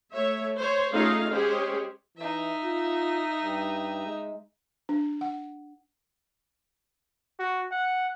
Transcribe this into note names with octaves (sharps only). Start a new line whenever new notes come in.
A3 C#5 E5
C5 C#5
A3 C#4 D#4 F4 G#4 F5
G#3 C#4 G4 G#4 C5 C#5
E3 D#4 E5
F4
G2
G#3
D4
F#5
F#4
F#5